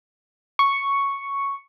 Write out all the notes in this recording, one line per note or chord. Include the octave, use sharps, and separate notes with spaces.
C#6